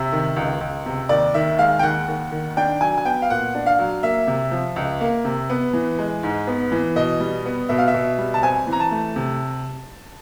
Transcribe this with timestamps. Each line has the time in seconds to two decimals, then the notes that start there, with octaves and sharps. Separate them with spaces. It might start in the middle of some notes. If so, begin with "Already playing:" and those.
Already playing: C3 E5
0.12 D#3
0.36 C#2
0.61 C#2
0.86 C3
1.09 D#2 D5
1.34 D#3 E5
1.59 G#3 F5
1.79 G5
1.83 D#2 F#5
2.08 D#2
2.32 D#3
2.57 D4 G5
2.81 F#3 G#5
2.97 G#5
3.05 B3 G5
3.22 F5
3.30 A#2 F#5
3.55 D4
3.66 F5
3.79 F#3
4.03 A#3 E5
4.27 C3
4.51 F3
4.76 C#2
5.01 A#3
5.25 C3
5.50 B3
5.73 E3
5.99 G#3
6.23 G#2
6.47 B3
6.72 E3
6.96 B2 D#5
7.20 G3
7.46 B3
7.69 B2 E5
7.78 F5
7.88 E5
7.94 B2
8.18 G3
8.34 A5
8.43 C4 G#5
8.67 E3
8.73 A#5
8.80 A5
8.91 A3
9.16 C3